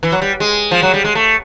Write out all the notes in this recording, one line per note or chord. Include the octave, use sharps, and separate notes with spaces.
E3
F#3
G3
G#3
F3
F#3
G3
G#3
A3